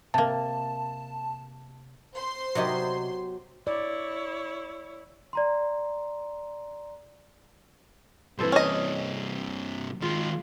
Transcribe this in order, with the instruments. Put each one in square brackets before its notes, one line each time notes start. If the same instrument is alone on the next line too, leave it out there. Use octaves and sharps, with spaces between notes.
[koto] C3 A#3 [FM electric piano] A5
[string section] C5 C6
[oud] C3 D5 D#5 [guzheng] F#3 B3 G4
[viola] E4 C#5 [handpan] D5
[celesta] D5 A#5 C6
[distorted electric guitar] G2 C3 [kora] E3 A4 C5
[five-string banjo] C#4 D#5
[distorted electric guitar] D#3 G#3 [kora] F4